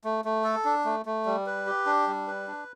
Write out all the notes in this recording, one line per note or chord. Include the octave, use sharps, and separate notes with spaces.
A3
A3
A4
D4
A3
A3
G3
B4
G4
D4
G3
B4
D4